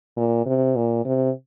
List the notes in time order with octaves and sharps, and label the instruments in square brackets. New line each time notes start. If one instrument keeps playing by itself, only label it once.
[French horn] A#2
C3
A#2
C3